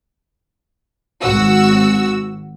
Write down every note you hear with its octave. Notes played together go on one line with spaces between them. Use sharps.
G#1 F#4 E6